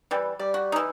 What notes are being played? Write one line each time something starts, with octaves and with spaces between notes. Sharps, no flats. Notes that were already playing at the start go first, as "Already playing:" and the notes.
E3 G3
G3 D5
F#4
E3 D#4